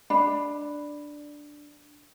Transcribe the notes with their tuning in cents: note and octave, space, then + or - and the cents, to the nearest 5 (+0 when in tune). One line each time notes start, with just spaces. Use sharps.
D4 +0 B5 +0